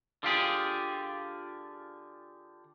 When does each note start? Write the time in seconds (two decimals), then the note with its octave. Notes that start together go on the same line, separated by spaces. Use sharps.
0.23 D3 F4 G4 G#4